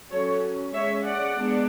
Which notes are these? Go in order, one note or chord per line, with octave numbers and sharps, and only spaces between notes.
F#3 C#4 A4 C#5
G#3 C#4 C#5 E5
D5 F#5
G#3 B3 D4